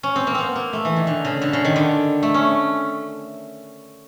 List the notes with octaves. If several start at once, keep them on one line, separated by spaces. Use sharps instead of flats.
C#4
C4
A#3
B3 C4
A#3
A3
E3
D#3
D3
C#3
D3
C#3
D#3
D3
A3
C#4